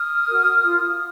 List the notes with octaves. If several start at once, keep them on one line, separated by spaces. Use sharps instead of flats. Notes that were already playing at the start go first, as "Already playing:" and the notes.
Already playing: D#6 F6
F#4 A#4
F4